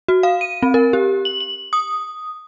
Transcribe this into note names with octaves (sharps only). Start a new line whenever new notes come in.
F#4
F5
D#7
C4
A#4
G4
F#7
F#7
D#6